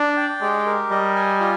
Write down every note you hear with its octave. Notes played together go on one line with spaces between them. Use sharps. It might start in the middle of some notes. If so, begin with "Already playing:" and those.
Already playing: D4 D5
G5
G#3 G4
A#4
G3 D#5
G#5
F4